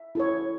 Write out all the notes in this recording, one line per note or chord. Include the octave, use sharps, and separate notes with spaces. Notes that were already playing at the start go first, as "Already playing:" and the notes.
Already playing: E5
E4 A4 C#5